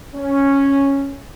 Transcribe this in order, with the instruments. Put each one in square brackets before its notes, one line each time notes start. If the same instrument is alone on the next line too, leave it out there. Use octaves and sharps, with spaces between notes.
[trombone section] C#4